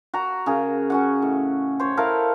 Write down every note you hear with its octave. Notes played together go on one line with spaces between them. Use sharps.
F#4 A#5
C#3 G#4 A#4
C#4 F#4 F#5
A2
C5 C#5
E4 A4 A#4 F5